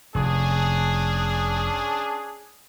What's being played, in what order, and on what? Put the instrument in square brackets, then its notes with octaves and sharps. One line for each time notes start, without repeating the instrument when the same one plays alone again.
[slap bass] F1 [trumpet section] C#4 D4 G#4